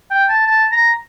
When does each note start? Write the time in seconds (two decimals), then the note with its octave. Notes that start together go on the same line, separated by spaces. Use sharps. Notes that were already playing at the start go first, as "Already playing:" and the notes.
0.11 G5
0.29 A5
0.47 A5
0.72 A#5